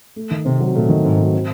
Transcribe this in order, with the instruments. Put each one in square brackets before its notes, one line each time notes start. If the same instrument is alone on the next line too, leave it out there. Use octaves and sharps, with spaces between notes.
[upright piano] A3
D#3
[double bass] C3 [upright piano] C4
[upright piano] F#3
[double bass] A#2 [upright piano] A3
[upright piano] D#3
[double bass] G#2 [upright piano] C4
[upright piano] F#3
C4